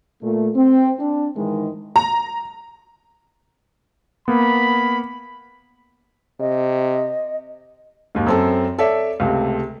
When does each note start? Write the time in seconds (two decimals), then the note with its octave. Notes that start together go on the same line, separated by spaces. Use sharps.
0.23 A#2 A3
0.56 C4
1.00 D4
1.36 G#2 D#3 E3 G#3
1.96 A#5
4.28 A#3 B3 B5
6.40 C3 D#5
8.15 D#2 G#2
8.26 F#2 C4 A4
8.78 A4 C#5 D5 E5
9.20 C#2 C3 A3